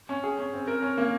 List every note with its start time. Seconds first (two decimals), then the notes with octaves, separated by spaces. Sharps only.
0.09 C#4
0.23 G#4
0.39 C#4
0.53 C4
0.68 A#4
0.82 C#4
0.98 A#3